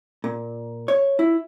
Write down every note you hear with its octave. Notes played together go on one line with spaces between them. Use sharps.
A#2
C#5
E4